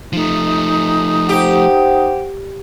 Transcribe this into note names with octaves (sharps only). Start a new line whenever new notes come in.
F3 A3 D#4
G4 C5 F#5 G5